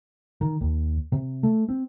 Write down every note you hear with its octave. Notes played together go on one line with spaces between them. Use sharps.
D#3
D#2
C3
A3
C4